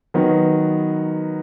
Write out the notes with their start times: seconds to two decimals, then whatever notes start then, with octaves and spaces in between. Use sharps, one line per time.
0.14 D#3 F#3 B3